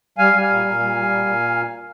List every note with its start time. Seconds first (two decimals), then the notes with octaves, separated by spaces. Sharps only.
0.18 G3 F5 G#5
0.33 G3
0.41 F5 G#5
0.49 A#2
0.65 A#2
0.79 G3
0.95 G3
1.09 A#2
1.26 A#2